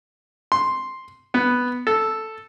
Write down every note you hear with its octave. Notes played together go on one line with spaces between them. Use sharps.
C6
B3
A4